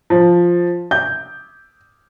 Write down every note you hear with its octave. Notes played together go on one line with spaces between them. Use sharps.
F3
G6